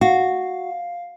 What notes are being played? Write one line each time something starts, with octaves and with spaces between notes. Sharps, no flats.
F#4 F5